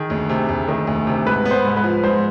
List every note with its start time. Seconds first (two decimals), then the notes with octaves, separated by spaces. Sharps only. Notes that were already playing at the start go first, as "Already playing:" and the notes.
Already playing: D#3 G#4
0.10 D2
0.29 C3
0.49 D2
0.68 D#3
0.87 D2
1.07 C3
1.26 G#2 B4
1.45 B3
1.51 C5
1.64 G#2
1.77 B4
1.84 F3
2.03 G#2 C5